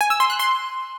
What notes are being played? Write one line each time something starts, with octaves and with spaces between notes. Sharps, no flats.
G#5
E6
C6
F#6
C6